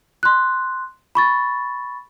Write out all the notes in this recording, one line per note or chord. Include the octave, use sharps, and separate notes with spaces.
C6 F#6
B5 C#6 A6